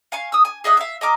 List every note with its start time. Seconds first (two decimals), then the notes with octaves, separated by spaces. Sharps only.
0.12 F5 G#5 C#6
0.32 D#6 E6
0.45 G#5
0.64 G#4 D#5 E5 F#5
0.77 E5 F5
1.01 D#5 A#5 D6 F6